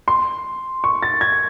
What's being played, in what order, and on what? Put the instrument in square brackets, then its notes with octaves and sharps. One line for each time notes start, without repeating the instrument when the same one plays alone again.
[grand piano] C6
C#6
A6
G#6